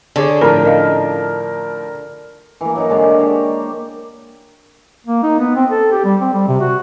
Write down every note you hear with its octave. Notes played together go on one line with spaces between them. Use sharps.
D3 G#4 C#5 D5
A2 F3 A#4 A#5 B5
C#4 D#5 F5
E3 A#3
F#3 D#4 A#4
D3 G#3 D5 C6
G4 C5 C#5
A#3
D#4
B3
C4
A4
G4
G3
C4
G3
C3
F#4